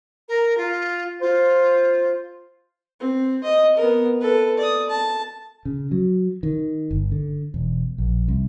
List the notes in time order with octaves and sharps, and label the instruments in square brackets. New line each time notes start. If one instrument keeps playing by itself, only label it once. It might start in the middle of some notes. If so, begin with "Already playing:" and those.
[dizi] A#4
F4
[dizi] F4 [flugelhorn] C5
[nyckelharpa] C4
D#5
B3 A#4
A4 B4
D5 D#6
A5
[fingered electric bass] C#3
F#3
D#3
G1
D3
E1
A#1
C2